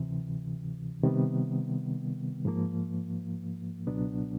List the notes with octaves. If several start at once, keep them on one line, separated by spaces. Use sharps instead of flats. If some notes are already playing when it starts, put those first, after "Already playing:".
Already playing: D2 C3 E3
C3 D#3 G3 B3
G#2 F3 A#3
C#2 B2 F#3 B3 D4